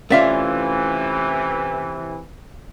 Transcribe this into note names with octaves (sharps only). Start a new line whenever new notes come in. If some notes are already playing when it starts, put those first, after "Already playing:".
C3 E3 A3 C#4 F4 D5 E5 F5